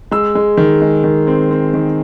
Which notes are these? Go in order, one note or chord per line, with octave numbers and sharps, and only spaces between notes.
G#3 E6
G#3
D#3
G#3
D#3
C4
C4
D#3